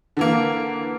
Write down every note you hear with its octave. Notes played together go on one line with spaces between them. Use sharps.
D3 E3 A#3